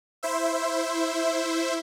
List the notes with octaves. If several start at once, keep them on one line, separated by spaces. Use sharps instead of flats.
E4 C5 E5